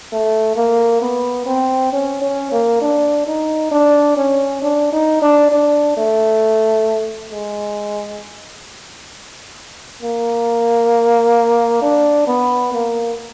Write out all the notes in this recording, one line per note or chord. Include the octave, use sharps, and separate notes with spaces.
A3
A#3
B3
C4
C#4
C#4
A#3
D4
D#4
D4
C#4
D4
D#4
D4
D4
A3
G#3
A#3
D4
B3
A#3